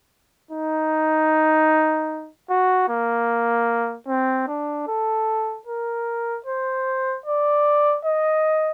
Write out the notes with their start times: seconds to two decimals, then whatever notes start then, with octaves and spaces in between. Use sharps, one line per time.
0.51 D#4
2.50 F#4
2.89 A#3
4.08 C4
4.48 D4
4.88 A4
5.67 A#4
6.46 C5
7.26 D5
8.05 D#5